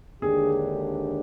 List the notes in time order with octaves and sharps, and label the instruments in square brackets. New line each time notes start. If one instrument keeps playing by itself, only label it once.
[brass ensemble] D#2 D3 G#3 D4 G4 [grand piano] G#4